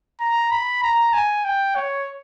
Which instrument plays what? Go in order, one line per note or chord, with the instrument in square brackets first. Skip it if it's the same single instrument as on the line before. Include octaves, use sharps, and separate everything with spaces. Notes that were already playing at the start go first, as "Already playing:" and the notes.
[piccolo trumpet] A#5
B5
A#5
G#5
G5
C#5